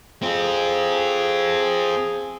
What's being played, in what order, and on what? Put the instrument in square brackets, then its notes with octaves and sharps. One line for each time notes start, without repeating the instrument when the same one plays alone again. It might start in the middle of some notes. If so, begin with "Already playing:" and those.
[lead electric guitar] C4 F4 [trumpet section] G#4